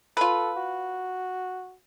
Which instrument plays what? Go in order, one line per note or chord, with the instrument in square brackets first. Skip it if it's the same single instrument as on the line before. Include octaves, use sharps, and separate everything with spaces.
[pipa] F4 B4 [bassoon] A4
[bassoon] F#4